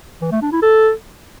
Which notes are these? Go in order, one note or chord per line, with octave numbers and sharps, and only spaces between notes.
E3
A3
D4
E4
A4